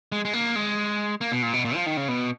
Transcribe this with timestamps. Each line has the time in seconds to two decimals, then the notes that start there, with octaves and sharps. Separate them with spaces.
0.12 G#3
0.25 G#3
0.33 A#3
0.56 G#3
1.21 A#3
1.32 B2
1.43 A#2
1.53 B2
1.65 A#2
1.75 F3
1.86 D#3
1.97 C#3
2.08 B2